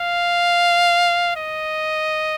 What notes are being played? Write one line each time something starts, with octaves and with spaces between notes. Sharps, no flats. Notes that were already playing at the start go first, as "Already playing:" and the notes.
Already playing: F5
D#5